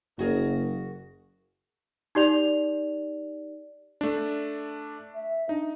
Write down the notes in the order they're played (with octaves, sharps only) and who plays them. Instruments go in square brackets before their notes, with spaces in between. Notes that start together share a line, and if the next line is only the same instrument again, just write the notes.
[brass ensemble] F#1 [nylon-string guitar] F#4 G#4 A#4
[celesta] D#4 G4 D5 F7
[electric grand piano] A3 D4
[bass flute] E5
[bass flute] D4 [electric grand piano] D#4